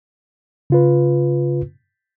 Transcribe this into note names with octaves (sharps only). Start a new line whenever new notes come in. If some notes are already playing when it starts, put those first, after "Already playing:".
C#3 F4 B4